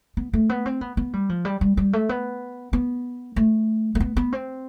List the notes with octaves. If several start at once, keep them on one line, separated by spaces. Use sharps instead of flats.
B3
A3
B3
C4
B3
B3
G3
F3
G3
G3
G3
A3
B3
B3
A3
A3
B3
B3
C4